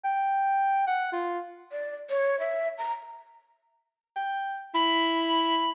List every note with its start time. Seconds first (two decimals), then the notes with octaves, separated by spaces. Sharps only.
0.04 G5
0.87 F#5
1.13 F4
1.72 D5
2.10 C#5
2.40 E5
2.78 A#5
4.16 G5
4.74 E4 B5